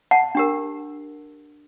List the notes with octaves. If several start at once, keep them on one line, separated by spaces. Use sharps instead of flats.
F#5 A5
D4 G4 A#4